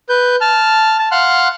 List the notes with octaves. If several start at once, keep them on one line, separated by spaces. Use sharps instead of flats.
B4 G6
A5 F6
A5
F5 F#5 C6 F6 F#6